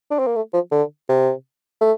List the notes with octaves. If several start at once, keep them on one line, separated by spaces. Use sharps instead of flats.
D4
C4
A#3
A3
F3
D3
C3
A3